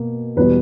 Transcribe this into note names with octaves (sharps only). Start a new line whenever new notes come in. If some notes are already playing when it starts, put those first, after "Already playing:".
Already playing: B2 A#3
E2 B2 G3 B3 B4